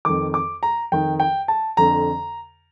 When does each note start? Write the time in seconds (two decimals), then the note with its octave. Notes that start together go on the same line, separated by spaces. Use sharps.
0.05 F2 D#3 D6
0.34 D6
0.63 A#5
0.92 F2 D#3 G5
1.20 G5
1.48 A5
1.77 F2 D3 A#5